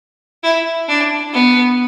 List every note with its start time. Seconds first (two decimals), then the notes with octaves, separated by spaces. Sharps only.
0.43 E4
0.88 D4
1.33 B3